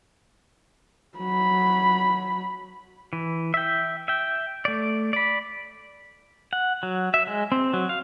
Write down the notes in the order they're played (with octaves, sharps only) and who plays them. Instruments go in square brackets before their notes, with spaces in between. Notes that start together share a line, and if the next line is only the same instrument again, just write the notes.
[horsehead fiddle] F#3 B5
[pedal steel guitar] E3
E5 G5
E5 G5
A3 D5
D5 B5
F#5
F#3
E5
G#3
C4
F#3
F5